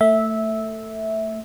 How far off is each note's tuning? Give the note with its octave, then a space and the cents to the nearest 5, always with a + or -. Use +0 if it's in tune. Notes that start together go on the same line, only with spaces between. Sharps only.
A3 +20 E5 -10